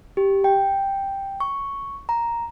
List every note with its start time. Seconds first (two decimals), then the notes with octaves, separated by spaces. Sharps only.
0.17 G4
0.44 G5
1.40 C#6
2.09 A#5